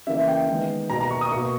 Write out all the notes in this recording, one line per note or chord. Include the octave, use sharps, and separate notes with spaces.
C#3 E3 A#3 E5
G5
D#3 G#3 B3
B2 A#3 A#5
A#5
C#6
D#6
B2 A#3 C#6